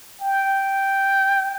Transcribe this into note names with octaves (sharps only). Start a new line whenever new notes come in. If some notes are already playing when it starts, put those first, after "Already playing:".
G5